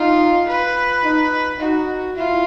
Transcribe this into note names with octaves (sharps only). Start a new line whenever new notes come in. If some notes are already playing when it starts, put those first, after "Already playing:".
Already playing: D#4 F4
B4
D#4
D#4 F#4
E4 F4